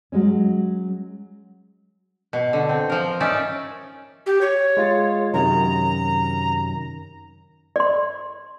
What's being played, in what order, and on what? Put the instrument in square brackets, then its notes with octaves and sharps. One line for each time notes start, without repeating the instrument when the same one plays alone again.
[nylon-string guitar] F#3 G#3 C#4
[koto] B2
D3
C4
F3 A#4
C#4 D#4 D5 E5
[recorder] G4
C#5
[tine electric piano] G#3 F4 A6
[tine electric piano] F#2 C3 D#3 [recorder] A#5
[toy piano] D5 C6